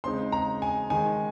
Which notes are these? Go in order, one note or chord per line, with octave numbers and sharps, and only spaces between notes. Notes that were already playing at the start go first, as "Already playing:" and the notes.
C#3 G#3 C4 D#4 C6
A#5
G#5
D#3 G#3 D#4 G#5